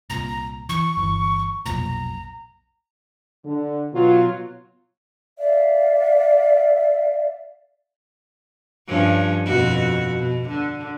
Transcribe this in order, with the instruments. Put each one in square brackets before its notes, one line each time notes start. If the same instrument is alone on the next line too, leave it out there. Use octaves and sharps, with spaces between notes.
[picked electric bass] C2 A#2 [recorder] A#5
[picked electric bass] E3 [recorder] C#6
[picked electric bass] G1 E3
[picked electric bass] F1 B1 A#2 [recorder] A#5
[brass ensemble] D3
B2 F#3 F4
[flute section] D5 E5 F5
[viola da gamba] G2 F3 C#4
F2 B2 F#4
B2
D3